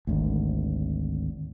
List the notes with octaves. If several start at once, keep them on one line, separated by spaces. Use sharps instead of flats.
G#1 D2